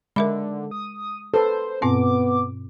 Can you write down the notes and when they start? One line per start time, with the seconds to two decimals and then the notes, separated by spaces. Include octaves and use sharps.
0.16 D3 G#3 A#4 E5 B5
0.71 D#6
1.34 A4 B4 C5
1.82 G2 B2 B3 C4 D6